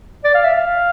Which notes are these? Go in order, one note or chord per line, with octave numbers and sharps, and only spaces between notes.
D5
F5
E5
F5